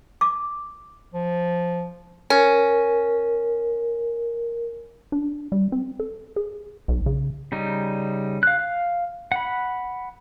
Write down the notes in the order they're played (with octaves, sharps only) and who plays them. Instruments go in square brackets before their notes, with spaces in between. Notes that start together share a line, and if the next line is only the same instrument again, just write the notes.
[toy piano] D6
[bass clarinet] F3
[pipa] C#4 [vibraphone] A#4
[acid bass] D4
G3
C4
A4
G#4
B1
C#3
[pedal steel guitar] C#3 G3 D#4
F5 F#6
F5
F#5 B5